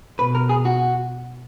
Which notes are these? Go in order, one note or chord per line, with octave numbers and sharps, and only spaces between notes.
B2 B4
A#4
G#4
F#4